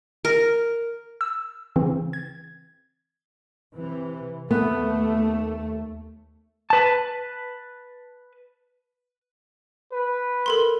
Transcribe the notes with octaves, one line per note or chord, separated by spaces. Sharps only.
A#4
E6
C#3 E3 C4
G#6
C3 E3
D#2 A3 B3
B4 A5
B4
A4 A#4 C6